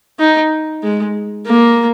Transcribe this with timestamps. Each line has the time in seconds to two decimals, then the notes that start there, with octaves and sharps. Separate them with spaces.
0.19 D#4
0.83 G#3
1.47 A#3